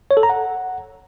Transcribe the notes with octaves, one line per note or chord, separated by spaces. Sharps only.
C#5
A4
A#5
F#5